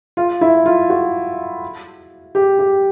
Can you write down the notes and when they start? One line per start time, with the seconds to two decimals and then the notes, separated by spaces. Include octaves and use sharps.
0.17 F4
0.41 E4
0.66 F4
0.90 F#4
2.35 G4
2.59 G4